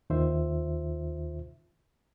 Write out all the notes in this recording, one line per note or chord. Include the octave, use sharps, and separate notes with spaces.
D#2 D#3 F4 C5 E5